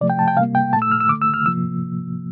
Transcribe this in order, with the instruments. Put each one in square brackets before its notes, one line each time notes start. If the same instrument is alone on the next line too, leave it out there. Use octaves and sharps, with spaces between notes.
[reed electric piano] C3 F3 A3 D5
G5
A5
G5
C3 G3 A#3 F5
G5
A#2 A3 A5
E6
F6
E6
D3 A3 D6
E6
F6
C3 F3 A#3 E6